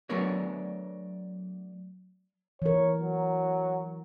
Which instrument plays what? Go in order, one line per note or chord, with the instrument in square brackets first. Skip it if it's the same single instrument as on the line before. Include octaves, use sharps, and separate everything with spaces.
[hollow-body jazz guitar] F#3 A3 B3 D4 A#4 C#5
[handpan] E3 A#4 [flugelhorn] C#5
[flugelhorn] F#3